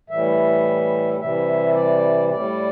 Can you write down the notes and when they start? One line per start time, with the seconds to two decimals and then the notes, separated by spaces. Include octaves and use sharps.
0.10 A2 E3 G3 E5
1.20 C3 E3 G3 E5
1.75 D5
2.30 A2 G3 D5